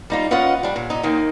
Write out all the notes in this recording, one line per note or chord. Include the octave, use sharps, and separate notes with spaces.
G3 D#4 F4
C#4 F4 B4 D#5 F#5
G3 D4
A#2
A#2 D#4
D#2 D#3 A#3